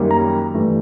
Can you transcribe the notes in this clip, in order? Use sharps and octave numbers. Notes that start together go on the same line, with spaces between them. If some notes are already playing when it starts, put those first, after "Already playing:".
Already playing: F#2 D#3 G3 A#3 C#4
A#5
G2 E3 A3